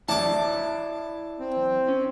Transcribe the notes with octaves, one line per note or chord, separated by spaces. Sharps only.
E4 C#5 D5 A5 D6
C4
C#4